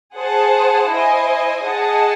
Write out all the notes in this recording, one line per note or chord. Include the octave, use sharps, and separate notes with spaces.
G#4 C5 F#5 A5
E4 C5 D#5 G#5
G#4 D#5 F#5 A5